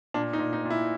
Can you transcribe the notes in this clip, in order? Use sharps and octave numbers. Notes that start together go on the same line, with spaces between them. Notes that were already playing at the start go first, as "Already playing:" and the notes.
A#2 D4
D#4
A#2
D#4
A#2
E4